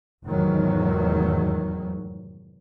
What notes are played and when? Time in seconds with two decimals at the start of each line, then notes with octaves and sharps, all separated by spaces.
0.24 F1 E2 G#2 D#3 F#3